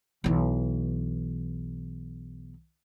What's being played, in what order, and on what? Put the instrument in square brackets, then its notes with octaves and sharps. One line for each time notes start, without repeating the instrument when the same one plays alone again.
[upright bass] B1 E3